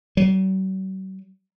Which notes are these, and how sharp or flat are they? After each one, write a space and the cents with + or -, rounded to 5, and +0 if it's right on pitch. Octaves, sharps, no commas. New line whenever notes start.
F#3 +45